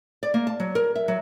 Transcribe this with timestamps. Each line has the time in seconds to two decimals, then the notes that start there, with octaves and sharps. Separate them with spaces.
0.23 D5
0.34 A#3
0.47 A5
0.60 F#3
0.75 A#4
0.95 E5
1.08 F#3